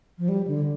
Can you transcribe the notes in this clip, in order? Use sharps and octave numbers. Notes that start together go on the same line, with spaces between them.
F3
G3
D3